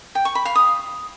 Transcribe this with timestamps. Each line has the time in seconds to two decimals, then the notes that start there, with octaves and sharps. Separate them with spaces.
0.15 G5
0.25 C#6
0.35 B5
0.45 F5
0.55 D#6